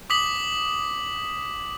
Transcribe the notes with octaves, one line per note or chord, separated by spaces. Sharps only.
D6 D#6 B6 F#7